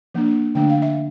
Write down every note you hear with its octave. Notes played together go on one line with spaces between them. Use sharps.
F3 A#3 D4
D3 F3 A3 D4 G5
F5
E5